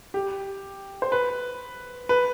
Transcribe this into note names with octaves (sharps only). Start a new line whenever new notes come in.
G4
C5
B4
B4